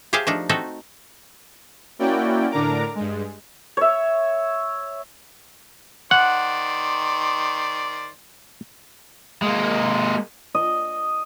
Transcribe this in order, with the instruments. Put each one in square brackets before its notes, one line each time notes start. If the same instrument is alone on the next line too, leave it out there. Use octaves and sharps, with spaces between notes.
[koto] G4 G#4 C5 E5 F5 A5
F3 A3 D4 D#4
A3 C4 D#4 F#4 A4
[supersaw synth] A#3 C#4 E4 F#4 D5 G5
A2 D3 D4 A#4 A#5 D6
G2 G#3
[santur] C#5 E5
[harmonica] D#3 C5 D5 [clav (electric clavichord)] F#5
[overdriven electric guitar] G#3 A#3
[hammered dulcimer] D#5